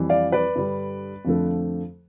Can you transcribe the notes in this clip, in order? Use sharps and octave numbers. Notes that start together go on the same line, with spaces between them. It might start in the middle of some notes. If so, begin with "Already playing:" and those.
Already playing: F2 E3 G3
D5 F5
B4 D5
G2 D3 G3
F2 D3 F3 A3